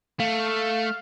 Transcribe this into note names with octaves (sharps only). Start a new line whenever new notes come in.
A3 F5